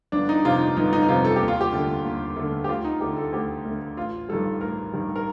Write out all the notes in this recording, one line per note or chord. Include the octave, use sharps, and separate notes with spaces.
G1 D4
D#4
F2 C3 F4
D#4
G1 D#4
D#4
D#4
F2 C3 F4
A4
D#2 G4
F4
G4
D3 A3
D#2
D3 A3
G4
D2 F4
D#4
D3 A3 G4
A4
D2 G4
D3 A3
A1 F4
G2 D#3 G3 A4
A1 A#4
G2 D#3 G3
A#4